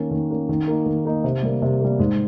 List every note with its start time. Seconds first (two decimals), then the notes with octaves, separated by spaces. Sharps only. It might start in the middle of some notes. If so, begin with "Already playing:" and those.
Already playing: D#3 A#3 C#4
0.11 D#3
0.31 A#3 C#4
0.49 D#3
0.68 A#3 D#4
0.86 D#3
1.05 A#3 D#4
1.24 C3
1.43 G3 A#3
1.62 C3
1.81 G3 A#3
1.99 G#2